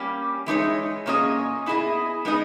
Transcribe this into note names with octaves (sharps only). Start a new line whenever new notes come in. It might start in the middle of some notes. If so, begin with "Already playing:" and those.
Already playing: G3 A#3 C#4 G4
E3 G#3 D#4 G#4 C#5
A#2 A#3 C#4 G#4 D#5
B3 E4 G#4 D#5
G#3 B3 D#4 G#4 D#5